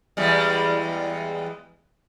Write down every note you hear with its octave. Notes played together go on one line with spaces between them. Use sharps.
E2 G3 G#3